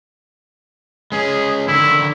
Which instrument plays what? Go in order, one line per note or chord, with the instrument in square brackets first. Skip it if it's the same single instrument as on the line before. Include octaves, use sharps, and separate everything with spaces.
[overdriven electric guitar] G#3 C#4 [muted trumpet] G#4
[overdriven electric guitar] D3 D#3 [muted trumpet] E4